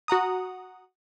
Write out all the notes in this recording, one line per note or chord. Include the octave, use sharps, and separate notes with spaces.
F#4 F#5 A#5 D#6